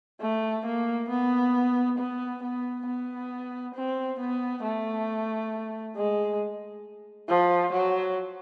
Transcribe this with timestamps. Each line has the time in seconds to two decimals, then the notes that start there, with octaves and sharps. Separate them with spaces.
0.20 A3
0.65 A#3
1.09 B3
1.98 B3
2.42 B3
2.86 B3
3.74 C4
4.19 B3
4.62 A3
5.95 G#3
7.29 F3
7.73 F#3